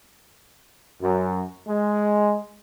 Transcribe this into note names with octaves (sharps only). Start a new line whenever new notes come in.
F#2
G#3